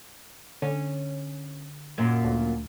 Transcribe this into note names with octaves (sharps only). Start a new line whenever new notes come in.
D3 C#4
F#2 A#2
D2